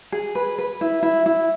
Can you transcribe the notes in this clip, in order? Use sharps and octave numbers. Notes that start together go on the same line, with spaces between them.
G#4
B4
B4
E4
E4
E4